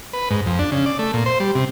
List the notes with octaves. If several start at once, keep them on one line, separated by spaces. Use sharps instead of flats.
B4
G#2
F2
D4
C#3
D5
A3
A#2
C5
G3
C3